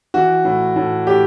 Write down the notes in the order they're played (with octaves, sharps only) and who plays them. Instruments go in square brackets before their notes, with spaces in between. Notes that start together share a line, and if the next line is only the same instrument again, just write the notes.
[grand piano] E3 F#4
A2
A2
A2 G4